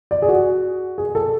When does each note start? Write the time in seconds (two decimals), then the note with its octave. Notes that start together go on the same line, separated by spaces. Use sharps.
0.11 D5
0.22 G#4
0.29 F#4
0.98 G#4
1.15 A4